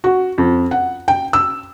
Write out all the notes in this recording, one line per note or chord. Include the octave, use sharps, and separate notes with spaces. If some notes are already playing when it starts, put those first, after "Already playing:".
F#4
F2
F#5
G5
E6